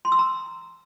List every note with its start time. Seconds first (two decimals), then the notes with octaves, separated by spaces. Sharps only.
0.05 C6
0.12 E6
0.19 A#5